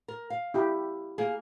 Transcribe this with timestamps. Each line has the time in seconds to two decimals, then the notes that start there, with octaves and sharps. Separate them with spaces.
0.08 A#4
0.30 F5
0.54 E4 G4
1.18 A#3 G#4